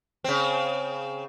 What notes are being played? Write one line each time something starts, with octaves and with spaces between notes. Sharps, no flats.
C#3 C4